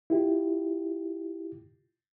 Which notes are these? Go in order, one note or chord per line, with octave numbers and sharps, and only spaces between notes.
E4 F4 G4